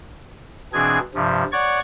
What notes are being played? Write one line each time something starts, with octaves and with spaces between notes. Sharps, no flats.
B2 E3 C4 D4 G#4 G#6
G2 C3 F3
C#5 D5 F#5 C#6